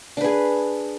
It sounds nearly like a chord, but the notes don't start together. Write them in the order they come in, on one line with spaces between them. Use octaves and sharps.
D4 B4 G#4